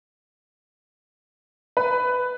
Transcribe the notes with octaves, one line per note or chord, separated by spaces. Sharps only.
B4